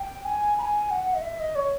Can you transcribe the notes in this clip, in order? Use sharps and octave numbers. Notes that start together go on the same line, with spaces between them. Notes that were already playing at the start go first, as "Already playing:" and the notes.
Already playing: G5
G#5
B5
G#5
F#5
D#5
E5
D#5
C#5